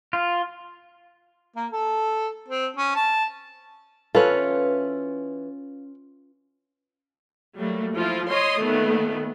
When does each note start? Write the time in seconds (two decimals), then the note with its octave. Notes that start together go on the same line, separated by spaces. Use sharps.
0.13 F4
1.56 A#3
1.72 A4
2.48 C4
2.76 C#4
2.95 A5
4.15 E3 B3 C#4 F4 A4 B4
7.57 F#3 G3 A3 A#3
7.94 F3 E4 F4
8.29 C#5 D#5 C6 D#6
8.63 A#2 D#3 A3 B3